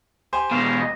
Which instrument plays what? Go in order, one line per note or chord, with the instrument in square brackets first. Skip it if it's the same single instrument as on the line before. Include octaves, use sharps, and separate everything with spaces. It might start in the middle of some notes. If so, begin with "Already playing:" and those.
[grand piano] G4 C5 G#5
[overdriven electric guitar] B2 G#3 [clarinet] F5
[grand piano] D#1 [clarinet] D#5